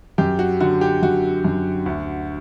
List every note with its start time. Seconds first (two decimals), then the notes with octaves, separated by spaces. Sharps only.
0.18 F#2 G4
0.39 F#4
0.60 D3 F#4
0.81 G4
1.02 F#2 F#4
1.44 F#2
1.86 D2